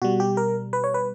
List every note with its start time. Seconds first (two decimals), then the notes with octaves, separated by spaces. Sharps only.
0.02 B2 G3 F#4
0.20 G4
0.37 A#4
0.73 B4
0.84 C#5
0.94 B4